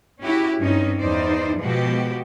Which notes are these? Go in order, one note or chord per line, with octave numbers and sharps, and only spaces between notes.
C#4 E4 F#4 G4
G2 C4 C#4 D#4
E2 D#4 C5 D5
B2 F3 G#3 F#4 G4